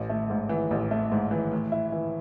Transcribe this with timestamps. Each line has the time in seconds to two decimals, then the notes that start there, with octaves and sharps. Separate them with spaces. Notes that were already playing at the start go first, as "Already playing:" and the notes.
Already playing: A1
0.09 A3
0.30 G#2
0.49 E3
0.71 A1
0.91 A3
1.12 G#2
1.31 E3
1.52 A2
1.72 E4
1.92 E3